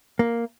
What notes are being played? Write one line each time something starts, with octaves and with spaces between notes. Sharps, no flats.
A#3